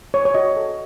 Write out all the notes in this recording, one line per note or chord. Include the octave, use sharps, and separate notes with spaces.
C#5
C#5
F#4 D#5
A4